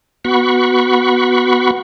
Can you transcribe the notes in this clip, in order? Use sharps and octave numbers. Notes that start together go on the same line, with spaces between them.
B3 F#4 B5 C#6